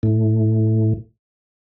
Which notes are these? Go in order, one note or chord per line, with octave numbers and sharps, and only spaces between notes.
A2